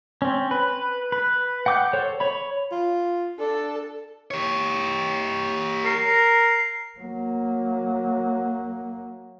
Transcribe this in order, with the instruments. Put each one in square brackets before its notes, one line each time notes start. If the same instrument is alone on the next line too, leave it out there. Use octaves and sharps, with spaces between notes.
[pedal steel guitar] C4 C#4
B4
B4
F#5 G5 D6 D#6 G6
A4 C5 C#5
C#5 B5
[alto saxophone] F4
[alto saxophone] D4 [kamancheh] A4
[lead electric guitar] G4 C#5
[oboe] A#4 [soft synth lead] C7
[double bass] F#3 A#3